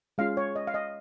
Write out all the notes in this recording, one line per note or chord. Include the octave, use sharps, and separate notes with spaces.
G#3 C#4 F4 F5
C#5
D#5
F5
D#5